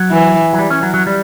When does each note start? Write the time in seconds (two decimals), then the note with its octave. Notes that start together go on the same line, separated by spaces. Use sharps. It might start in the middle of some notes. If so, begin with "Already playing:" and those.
Already playing: F#3
0.11 E3
0.53 F#3
0.59 G3
0.70 C#4
0.83 F#3
0.94 F#3
1.07 G3